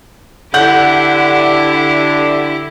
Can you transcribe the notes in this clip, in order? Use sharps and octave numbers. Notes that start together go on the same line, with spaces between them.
D3 E4 G4 F#5 G6